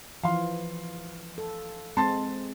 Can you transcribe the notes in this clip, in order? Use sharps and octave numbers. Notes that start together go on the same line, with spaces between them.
E3 F3 F5 C6
A4
G#3 C4 A5 C6 A6